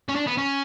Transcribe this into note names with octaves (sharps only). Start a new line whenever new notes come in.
C#4
D4
B3
C#4